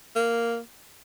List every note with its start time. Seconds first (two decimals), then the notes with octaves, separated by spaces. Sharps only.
0.16 A#3